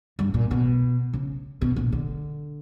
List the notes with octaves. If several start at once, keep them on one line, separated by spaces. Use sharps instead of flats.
G2
A#2
B2
C#3
B2
A#2
D3